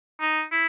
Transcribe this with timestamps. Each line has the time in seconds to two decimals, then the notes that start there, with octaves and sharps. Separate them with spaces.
0.20 D#4
0.52 E4